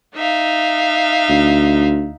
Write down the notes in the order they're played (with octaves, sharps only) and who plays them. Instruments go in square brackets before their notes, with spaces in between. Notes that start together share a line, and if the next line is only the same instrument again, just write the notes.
[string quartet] D#4 E5 F5
[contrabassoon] D2